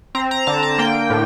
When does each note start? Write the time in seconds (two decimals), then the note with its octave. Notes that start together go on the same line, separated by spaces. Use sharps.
0.15 C4 A#5
0.31 A#5
0.47 D3 A5
0.63 A5
0.78 A#3 G5
1.10 A2